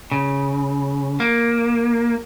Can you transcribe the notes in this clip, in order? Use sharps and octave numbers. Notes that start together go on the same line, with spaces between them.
C#3
A#3